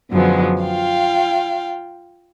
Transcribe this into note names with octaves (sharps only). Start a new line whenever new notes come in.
F#2 D3 F3 F#3 G#3 B3
F4 F5 G5